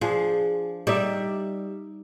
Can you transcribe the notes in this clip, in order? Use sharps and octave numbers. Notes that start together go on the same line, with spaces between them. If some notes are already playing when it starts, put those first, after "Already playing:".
F3 D4 G#4
G3 D#4 D5 E5